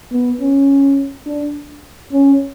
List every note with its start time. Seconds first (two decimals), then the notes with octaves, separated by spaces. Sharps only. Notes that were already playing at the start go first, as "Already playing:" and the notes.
0.12 B3
0.40 C#4
1.26 D4
2.12 C#4